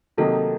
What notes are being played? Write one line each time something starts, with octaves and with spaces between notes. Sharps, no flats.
C3 D#3 F#3 A#3 D#4 A4